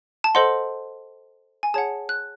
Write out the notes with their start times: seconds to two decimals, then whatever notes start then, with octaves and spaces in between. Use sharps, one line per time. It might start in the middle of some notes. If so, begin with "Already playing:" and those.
0.24 A5
0.35 A4 C5 D#5 F#5 C6
1.63 G#5
1.74 G#4 C#5 F#5 A5
2.09 F#6